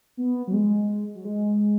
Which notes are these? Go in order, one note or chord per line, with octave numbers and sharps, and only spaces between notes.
B3
F#3
G#3
F#3
G#3